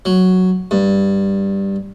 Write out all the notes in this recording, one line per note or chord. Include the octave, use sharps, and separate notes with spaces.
F#3
G2